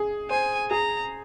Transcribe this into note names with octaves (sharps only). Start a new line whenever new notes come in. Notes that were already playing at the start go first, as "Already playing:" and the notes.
Already playing: G#4
C5 G#5
G#4 A#5